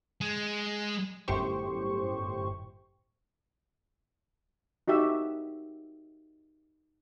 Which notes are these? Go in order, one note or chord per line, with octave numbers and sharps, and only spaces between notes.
G#3
G1 F#2 A2 G4 C5 C#6
D#4 F#4 G4 E5